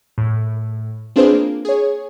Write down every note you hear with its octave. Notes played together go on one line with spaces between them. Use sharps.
A2
C4 D4 F4 G#4 B4 C5
A#3
G#4 C#5